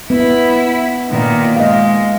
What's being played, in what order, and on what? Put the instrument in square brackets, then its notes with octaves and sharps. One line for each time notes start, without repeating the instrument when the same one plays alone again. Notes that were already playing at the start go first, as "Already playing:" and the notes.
[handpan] B3 [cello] E4
[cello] A#2 D#3
[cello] G#3 [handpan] D#5 F5